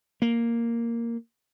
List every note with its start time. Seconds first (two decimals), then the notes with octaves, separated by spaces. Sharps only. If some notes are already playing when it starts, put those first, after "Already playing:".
0.22 A#3